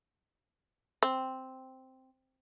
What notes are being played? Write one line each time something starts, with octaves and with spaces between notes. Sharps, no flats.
C4